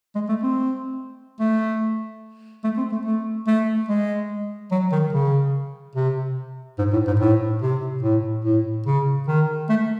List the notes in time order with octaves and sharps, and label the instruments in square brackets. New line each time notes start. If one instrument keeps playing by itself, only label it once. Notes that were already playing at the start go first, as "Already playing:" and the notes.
[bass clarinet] G#3
A3
C4
A3
A3
C4
A3
A3
A3
G#3
F#3
D#3
C#3
C3
G#2
A2
G#2
A2
C3
A2
A2
C#3
D#3
A3